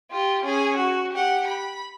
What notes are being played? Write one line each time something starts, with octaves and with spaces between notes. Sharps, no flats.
F4 G4
C#4 G#4
F#4
G4 F#5
B5